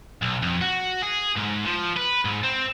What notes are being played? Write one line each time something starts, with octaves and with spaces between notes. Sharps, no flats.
B1
F2
F#4
G#4
G#2
F3
B4
G#2
C4